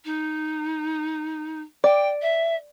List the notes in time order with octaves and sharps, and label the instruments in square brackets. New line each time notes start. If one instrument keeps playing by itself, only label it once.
[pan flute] D#4
[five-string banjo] D5 [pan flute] G5
[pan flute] E5